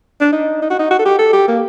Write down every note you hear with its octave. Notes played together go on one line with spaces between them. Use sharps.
D4
D#4
D#4
F#4
D#4
F#4
A4
G4
A4
G4
A#3